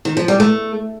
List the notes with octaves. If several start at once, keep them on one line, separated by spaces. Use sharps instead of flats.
D#3
F3
G3
A3